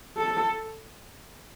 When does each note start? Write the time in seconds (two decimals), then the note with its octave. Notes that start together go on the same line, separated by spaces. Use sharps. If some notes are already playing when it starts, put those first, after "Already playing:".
0.17 A4